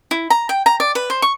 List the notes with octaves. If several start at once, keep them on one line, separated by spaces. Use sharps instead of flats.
E4
A#5
G5
A#5
D5
B4
C5
C#6